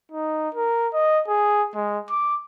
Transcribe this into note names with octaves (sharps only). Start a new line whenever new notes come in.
D#4
A#4
D#5
G#4
G#3
D6